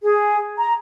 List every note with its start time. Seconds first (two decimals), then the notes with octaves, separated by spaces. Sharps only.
0.03 G#4
0.58 A#5